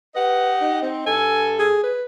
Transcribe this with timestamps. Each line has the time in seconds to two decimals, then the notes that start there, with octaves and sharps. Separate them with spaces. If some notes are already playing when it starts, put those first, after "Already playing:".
0.15 G4 B4 D#5 F#5
0.61 D#4
0.81 C4
1.06 G2 A4 G#5
1.59 G#4
1.84 B4